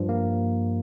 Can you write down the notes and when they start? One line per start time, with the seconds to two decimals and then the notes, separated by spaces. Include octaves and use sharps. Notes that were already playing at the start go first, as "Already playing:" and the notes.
Already playing: G2 F3
0.09 A#3